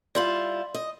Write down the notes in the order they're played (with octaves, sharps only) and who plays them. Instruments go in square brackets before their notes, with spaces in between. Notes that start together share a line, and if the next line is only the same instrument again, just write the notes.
[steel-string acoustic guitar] G3 E4 F4 [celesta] D5 C6 F#7
[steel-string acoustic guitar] D#5